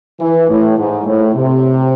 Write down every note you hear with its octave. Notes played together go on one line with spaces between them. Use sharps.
E3
A2
G#2
A2
C3